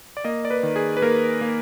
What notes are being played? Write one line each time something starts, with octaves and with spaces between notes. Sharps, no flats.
D5
A#3 D#5
D5
B4
D#3
G#4
B4
A#3 A#4
A#3